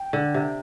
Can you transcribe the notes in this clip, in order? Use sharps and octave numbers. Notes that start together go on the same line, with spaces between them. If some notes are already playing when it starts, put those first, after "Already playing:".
Already playing: G5
D3
C3